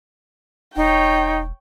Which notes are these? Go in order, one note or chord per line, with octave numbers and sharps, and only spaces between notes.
E1 D#4 C#5 G5